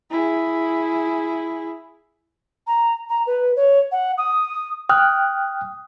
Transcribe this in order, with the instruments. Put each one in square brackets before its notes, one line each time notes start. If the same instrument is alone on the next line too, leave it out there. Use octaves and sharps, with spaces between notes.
[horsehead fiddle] E4 G#4
[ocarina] A#5
A#5
B4
C#5
F#5
D#6
[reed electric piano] G5 F6 F#6 [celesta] D#6